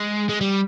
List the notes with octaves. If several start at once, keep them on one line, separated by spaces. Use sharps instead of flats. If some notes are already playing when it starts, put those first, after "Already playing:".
Already playing: G#3
G#3
G3